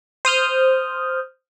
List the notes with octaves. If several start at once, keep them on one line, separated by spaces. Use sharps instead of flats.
C5 D#6 F6 G6